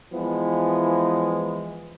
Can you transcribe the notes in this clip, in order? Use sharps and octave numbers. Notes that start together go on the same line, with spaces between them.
E3 F3 G#3 B3 E4